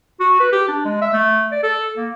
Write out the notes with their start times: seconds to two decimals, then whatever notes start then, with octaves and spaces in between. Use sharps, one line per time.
0.20 F#4
0.40 B4
0.53 G4
0.68 D4
0.85 G#3
1.02 E5
1.13 A3
1.52 D5
1.63 A4
1.97 A#3